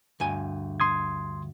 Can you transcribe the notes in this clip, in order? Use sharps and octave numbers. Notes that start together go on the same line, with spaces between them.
D2 G2 G#5
C6 D#6 G#6